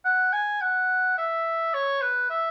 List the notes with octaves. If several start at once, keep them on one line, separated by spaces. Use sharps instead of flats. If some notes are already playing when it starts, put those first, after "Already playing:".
F#5
G#5
F#5
E5
C#5
B4
E5